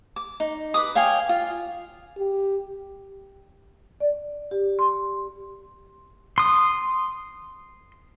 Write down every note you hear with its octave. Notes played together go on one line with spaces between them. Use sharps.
D6
D#4
B4 D6 D#6
C#5 F5 G5 G#5
F4
G4
D5
G4
C6
C6 D#6